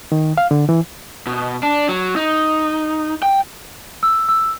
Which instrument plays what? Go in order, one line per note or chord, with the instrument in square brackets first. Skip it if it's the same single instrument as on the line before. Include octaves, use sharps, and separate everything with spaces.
[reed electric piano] D#3
F5
D3
E3
[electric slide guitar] B2
D4
F#3
D#4
G5
[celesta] E6
E6